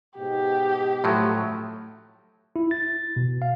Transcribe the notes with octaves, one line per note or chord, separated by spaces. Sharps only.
G#2 B2 G4
A2 F3 F#3 A3
E4
A6
B2
F5